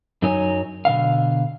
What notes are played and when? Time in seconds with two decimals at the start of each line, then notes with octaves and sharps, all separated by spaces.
0.22 F#2 F#3 D#4 C#5 G#5
0.85 B2 D3 F5